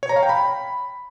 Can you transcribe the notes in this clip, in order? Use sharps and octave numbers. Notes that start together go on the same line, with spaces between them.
C#5
A#5
F5
G5
B5